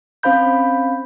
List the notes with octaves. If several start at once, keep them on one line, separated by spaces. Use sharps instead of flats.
C4 C#4 C5 F5 B5 G6